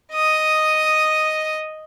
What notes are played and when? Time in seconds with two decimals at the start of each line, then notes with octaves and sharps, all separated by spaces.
0.13 D#5 D#6